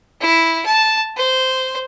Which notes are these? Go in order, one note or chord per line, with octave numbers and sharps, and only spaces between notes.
E4
A5
C5